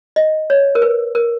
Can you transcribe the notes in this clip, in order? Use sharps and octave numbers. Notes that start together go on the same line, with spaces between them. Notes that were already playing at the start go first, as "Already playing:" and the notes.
D#5
C#5
A#4
B4
A#4